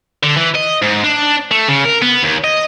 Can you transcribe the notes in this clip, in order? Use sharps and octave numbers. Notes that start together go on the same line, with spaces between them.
D3
E3
D#5
G#2
D4
A3
C#3
A#4
B3
D#2
D#5